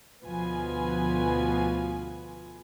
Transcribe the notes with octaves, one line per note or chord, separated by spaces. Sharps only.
D2 B2 F3 F4 B4 G#5